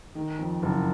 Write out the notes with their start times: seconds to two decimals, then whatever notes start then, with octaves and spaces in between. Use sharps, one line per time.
0.15 D#3
0.39 F2
0.62 F#1